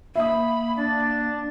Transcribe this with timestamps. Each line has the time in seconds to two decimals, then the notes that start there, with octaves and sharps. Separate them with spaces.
0.15 A#3 E5 B5 D#6
0.78 D4 A6